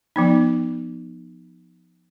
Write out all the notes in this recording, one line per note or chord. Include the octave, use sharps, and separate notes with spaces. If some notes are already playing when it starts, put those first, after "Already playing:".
F3 B3 D#4